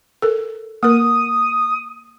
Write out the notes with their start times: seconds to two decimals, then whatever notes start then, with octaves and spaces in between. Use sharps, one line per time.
0.22 A4 A#4
0.83 A#3 A#4 D#6